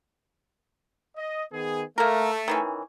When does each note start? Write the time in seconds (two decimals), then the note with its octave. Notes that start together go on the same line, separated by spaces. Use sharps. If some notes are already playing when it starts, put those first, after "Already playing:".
1.17 D#5
1.53 D#3 B3 G#4
1.98 A3 A#3 A#4
2.48 D#3 E3 C#4